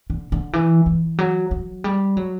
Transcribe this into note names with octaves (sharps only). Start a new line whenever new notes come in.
D3
D3
E3
E3
F#3
F#3
G3
F#3